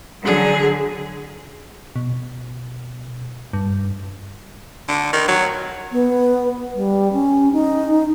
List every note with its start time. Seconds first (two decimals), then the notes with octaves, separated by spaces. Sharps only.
0.25 D3 F#3 G#4
1.96 B2
3.53 G2
4.88 D3
5.13 D#3
5.28 F#3
5.92 B3
6.75 G3
7.13 C#4
7.52 D#4